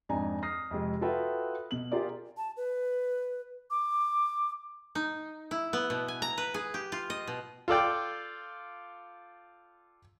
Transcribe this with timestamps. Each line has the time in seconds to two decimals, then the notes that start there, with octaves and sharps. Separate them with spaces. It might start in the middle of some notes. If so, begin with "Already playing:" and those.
0.09 F2 G#2 D4 D#4 G#5 A#5
0.42 D#6 F6 A#6 C7
0.71 F2 C3 G#3
1.01 F4 F#4 A4 B4 E5 G5
1.71 B2 F#7
1.92 F4 G4 G#4 A#4 D5
2.37 A5
2.57 B4
3.70 D6
4.95 D#4
5.51 E4
5.73 B3
5.90 B2
6.08 G#5
6.22 A#5
6.38 B4
6.54 G#4
6.74 G4
6.92 F4
7.10 D#5
7.27 B2
7.68 F4 A4 D5 G5